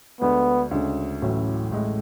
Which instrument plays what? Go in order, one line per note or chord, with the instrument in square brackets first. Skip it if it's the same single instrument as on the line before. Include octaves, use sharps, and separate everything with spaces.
[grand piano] D2 D3 G#3 D4 [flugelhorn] B3
[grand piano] D2 C#3 G#3 C#4
A1 A2 F#3 C#4 E4
A1 A2 G#3